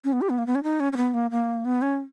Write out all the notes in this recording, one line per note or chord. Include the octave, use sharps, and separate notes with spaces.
C#4
B3
G4
B3
A#3
B3
C#4
D#4
C#4
C#4
B3
A#3
A#3
B3
C#4